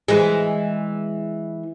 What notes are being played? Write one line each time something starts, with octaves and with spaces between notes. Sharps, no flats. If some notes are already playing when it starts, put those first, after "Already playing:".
E3 G#3